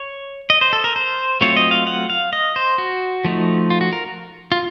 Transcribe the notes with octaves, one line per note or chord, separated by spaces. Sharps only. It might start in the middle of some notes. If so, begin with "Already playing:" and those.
Already playing: C#5
D#5
C5
A4
A#4
C5
F#3 A3 C4 F4 C#5
D#5
F5
F#5
F5
D#5
C5
F#4
F3 A3 D#4
F4
F#4
A#4
F4